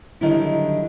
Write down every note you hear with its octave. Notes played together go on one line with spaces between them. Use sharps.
D3 D#3 F#3 G3 D#4 E4